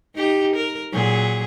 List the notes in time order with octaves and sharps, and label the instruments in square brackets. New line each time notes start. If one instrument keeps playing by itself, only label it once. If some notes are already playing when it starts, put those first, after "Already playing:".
[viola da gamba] D#4 G4
A#4
A#2 F#3 G#4